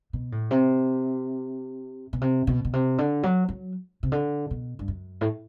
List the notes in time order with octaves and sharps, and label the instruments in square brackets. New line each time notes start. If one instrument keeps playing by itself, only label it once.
[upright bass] B2
A2
C3
B2
C3
B2
B2
C3
D3
F#3
F#3
C3
D3
B2
G2
F#2
A2